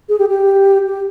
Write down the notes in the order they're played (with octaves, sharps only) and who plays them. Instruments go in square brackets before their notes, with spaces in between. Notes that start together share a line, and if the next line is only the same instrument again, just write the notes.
[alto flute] G#4
G4
G4
G4